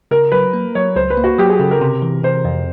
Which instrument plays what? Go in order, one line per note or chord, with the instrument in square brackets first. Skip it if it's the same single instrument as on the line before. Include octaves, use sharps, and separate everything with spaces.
[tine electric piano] C#3 [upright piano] A#4
[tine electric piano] F#3 [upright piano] B4
[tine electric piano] A#3
[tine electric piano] F#3 [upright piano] C#5
[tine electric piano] C#2 [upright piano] C5
[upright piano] B4
[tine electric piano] A#3
[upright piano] F#4
[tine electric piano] F#3 [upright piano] G4
[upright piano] G#4
[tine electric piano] C#3 [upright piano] A4
[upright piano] A#4
[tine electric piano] C3
E3
[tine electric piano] C3 [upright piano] C5
[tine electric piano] F2